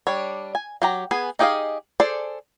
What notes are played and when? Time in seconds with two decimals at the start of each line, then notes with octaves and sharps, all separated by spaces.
0.07 G3 D4 C#5
0.55 G#5
0.82 F#3 G4 A#5
1.11 B3 G#4 G#5
1.39 D#4 G4 G#4 D#5 F5
2.00 G#4 A4 C5 D5